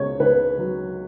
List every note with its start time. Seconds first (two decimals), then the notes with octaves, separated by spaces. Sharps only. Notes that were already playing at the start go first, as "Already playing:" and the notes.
Already playing: C#2 B2 C#5
0.20 C#2 B4
0.59 F#3